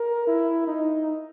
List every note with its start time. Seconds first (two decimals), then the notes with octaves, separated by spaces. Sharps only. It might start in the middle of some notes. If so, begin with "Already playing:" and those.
Already playing: A#4
0.27 E4
0.67 D#4